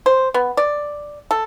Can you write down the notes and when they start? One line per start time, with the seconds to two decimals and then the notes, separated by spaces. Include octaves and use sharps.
0.06 C5
0.34 B3
0.57 D5
1.31 A4